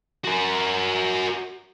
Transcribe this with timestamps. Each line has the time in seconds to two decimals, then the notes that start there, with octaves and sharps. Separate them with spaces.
0.25 F#4 A#4